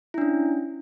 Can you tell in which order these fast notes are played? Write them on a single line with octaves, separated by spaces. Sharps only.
E4 D4 C#4